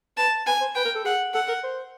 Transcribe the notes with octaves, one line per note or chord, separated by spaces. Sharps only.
B4 A5
B4 G#5
C5
B4 G5
A#4
A4
G#4 F#5
A4 F#5
A#4
C5